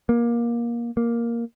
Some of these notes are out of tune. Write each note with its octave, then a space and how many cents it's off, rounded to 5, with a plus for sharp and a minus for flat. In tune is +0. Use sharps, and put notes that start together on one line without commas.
A#3 +20
A#3 +5